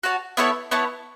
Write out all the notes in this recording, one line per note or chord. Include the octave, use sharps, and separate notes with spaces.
F#4 C#5 A5
B3 E4 A4 C#5
B3 E4 C#5 A5